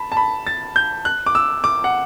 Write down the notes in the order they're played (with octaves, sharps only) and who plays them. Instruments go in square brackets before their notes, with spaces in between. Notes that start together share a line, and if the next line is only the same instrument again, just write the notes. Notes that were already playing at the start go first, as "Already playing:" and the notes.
Already playing: [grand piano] A5 B5
A5
B5
A6
G6
F#6
D6
E6
D6
F#5